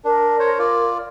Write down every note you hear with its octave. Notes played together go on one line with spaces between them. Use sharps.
D4 A#4
C5 C#5
F4 D5